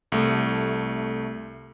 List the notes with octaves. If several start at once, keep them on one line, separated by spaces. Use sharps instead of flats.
C2 A3